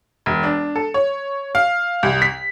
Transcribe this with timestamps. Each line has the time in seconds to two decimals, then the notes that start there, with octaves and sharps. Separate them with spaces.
0.26 E1
0.43 D4
0.76 A4
0.94 C#5
1.55 F5
2.03 C2
2.22 B6